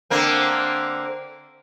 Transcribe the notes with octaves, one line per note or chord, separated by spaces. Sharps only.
D3 A#3 C4